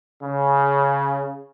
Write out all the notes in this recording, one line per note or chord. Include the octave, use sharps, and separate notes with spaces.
C#3